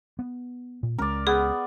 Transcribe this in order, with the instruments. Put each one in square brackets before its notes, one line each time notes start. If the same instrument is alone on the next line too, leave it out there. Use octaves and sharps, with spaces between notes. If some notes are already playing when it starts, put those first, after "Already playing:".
[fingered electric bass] B3
A#2
[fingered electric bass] C#2 G#3 C#4 [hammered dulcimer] A#4 D5
[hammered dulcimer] B3 [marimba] G#4